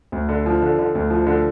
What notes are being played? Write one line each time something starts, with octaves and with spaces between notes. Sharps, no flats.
D2
D3
F3
D3
D3
D2
F3
D3